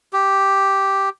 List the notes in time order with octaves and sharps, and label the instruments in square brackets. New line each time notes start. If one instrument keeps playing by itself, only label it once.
[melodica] G4